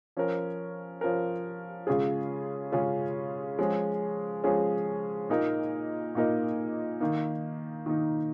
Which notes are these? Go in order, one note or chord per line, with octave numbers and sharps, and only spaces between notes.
F3 C#4 A#4
F3 C#4 A#4
C#3 G#3 C#4 F4 G#4
C#3 G#3 C#4 F4 G#4
F3 G#3 C#4 G#4
F3 G#3 C#4 G#4
A#2 A#3 D#4 A#4 D#5
A#2 A#3 D#4 A#4 D#5
D#3 A#3 D#4
D#3 A#3 D#4